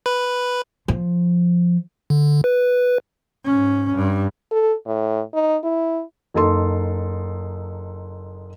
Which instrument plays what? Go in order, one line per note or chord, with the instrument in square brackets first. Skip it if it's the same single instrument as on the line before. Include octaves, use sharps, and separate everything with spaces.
[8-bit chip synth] B4
[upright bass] F3
[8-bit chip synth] D3
B4
[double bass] G#2 C#4
G2
[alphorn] A4
A2
D#4
E4
[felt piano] F#1 D#4 A4 C6